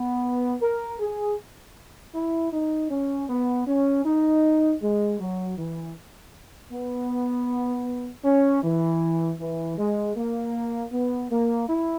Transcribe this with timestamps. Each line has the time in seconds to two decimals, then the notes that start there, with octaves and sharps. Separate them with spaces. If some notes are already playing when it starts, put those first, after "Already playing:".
Already playing: B3
0.62 A#4
1.00 G#4
2.14 E4
2.52 D#4
2.91 C#4
3.29 B3
3.67 C#4
4.05 D#4
4.82 G#3
5.19 F#3
5.58 E3
6.72 B3
8.25 C#4
8.63 E3
9.40 E3
9.78 G#3
10.16 A#3
10.92 B3
11.30 A#3
11.69 E4